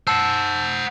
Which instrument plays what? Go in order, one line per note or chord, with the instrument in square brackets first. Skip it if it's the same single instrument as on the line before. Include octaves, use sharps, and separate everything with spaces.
[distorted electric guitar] C5 F#5 [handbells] A5 E6